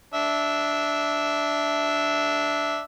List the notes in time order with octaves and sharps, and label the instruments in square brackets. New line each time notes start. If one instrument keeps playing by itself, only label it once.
[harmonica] D4 E5